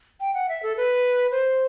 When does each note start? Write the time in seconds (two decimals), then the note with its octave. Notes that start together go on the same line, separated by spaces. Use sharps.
0.20 G5
0.34 F#5
0.49 E5
0.63 A4
0.77 B4
1.32 C5